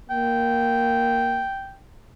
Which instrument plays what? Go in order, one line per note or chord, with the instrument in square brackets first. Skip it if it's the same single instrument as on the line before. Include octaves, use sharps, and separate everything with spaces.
[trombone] A#3 [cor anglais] G5